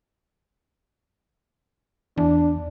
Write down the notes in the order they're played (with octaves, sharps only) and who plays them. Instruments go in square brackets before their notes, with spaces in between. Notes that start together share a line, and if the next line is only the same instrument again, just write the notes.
[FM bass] E2 [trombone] D4